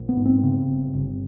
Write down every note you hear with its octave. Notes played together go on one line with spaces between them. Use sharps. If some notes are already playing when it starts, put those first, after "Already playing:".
Already playing: A#1
B3
G#2
C4
C#3
G1
G1